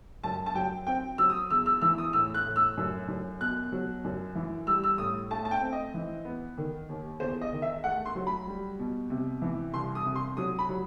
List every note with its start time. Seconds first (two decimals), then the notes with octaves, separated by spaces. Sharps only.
0.23 F#2 A5
0.46 A5
0.55 F#3 G5
0.87 C4 G5
1.18 F#3 E6
1.30 D#6
1.50 E2 E6
1.66 E6
1.81 E3 E6
1.98 D#6
2.13 A2 E6
2.34 F#6
2.46 A2
2.56 E6
2.77 F#2
3.08 F#2
3.41 B2 F#6
3.72 F#3
4.04 F#2
4.35 E3
4.67 G3 E6
4.84 E6
4.98 A2 D#6
5.31 A3 A5
5.45 A5
5.51 G5
5.62 C4
5.73 D#5
5.94 E3
6.25 B3
6.58 D#3
6.89 D#2
7.20 E2 C5
7.41 D#5
7.52 D#3
7.62 E5
7.84 A3 F#5
8.06 C6
8.15 F#3
8.27 B5
8.47 G3
8.79 B2
9.10 C3
9.42 E3
9.73 C2 C6
9.95 D#6
10.05 C3
10.16 C6
10.37 F#3 D#6
10.59 B5
10.69 F#3